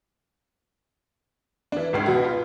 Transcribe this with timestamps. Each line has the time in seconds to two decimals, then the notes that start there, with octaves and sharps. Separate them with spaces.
1.72 E3 D4
1.93 G#1 C#2 C7
2.06 B2 F#4
2.24 F4